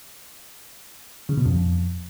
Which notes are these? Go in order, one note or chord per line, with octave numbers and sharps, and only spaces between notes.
C#3
B2
F2